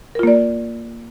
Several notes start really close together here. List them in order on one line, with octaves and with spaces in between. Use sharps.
A#4 F4 A#3 D5